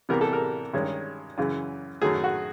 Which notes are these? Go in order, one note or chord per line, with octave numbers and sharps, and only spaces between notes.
C3 E3 G3 B3 A#4
A4
A#4
G2 D#3 G#3 C#4
F#2 C#3 E3
F#2 D#3 F#3 A3 G#4
F#4